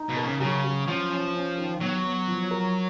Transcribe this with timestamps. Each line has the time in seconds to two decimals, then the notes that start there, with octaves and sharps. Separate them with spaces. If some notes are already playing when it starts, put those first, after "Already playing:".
Already playing: D#4
0.09 B2
0.16 A#4
0.24 C#3
0.40 C#3 F#3
0.64 F#3
0.87 F3 C#4
1.10 C#4
1.35 C#4
1.58 D#3
1.81 F#3 B3
2.05 B3
2.28 F3
2.51 A#4